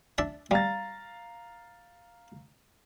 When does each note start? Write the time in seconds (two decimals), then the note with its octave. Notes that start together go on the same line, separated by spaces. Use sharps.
0.18 D4 E5 A5
0.51 G3 F5 A#5 A6